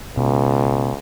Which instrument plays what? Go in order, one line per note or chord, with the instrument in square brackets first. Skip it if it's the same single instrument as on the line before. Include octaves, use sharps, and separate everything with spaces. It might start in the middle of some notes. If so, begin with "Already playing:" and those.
[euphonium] C#2 [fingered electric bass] B2